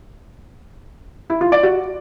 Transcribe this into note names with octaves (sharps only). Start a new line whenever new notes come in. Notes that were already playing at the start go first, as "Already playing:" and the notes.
E4
F4
D5
F#4